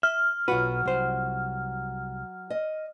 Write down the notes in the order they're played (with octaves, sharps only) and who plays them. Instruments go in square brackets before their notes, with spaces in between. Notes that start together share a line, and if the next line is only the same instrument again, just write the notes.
[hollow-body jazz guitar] E5 [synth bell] F6
[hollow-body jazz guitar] B1 B4 [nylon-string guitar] F#3 F4 F#4
[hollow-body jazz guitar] C2 C5
[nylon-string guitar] D#5